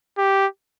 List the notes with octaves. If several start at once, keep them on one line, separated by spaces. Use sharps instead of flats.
G4